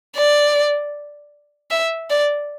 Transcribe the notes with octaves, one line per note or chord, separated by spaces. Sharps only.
D5
E5
D5